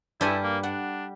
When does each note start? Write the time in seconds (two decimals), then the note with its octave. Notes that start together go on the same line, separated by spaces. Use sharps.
0.21 G2 G3 E4 A4 G#5
0.43 A#3
0.63 D4 F#5